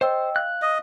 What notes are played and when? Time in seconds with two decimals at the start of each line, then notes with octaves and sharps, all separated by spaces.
0.01 C5 D#5 G5 E6
0.36 F5 F#6
0.62 D#5